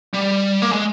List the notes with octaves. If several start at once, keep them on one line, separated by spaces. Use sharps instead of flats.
G3
A#3
G#3